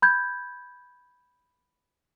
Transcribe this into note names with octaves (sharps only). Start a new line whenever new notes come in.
B5 G6 G#6